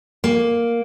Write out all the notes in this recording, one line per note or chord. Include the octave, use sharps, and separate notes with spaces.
A#3